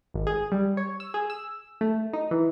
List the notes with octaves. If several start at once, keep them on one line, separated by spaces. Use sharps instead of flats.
G#1
G#4
G3
C#5
E6
G#4
E6
A3
D#4
E3